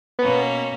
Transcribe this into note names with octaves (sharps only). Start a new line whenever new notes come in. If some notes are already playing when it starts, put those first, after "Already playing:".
B2 A#3 B3 C#4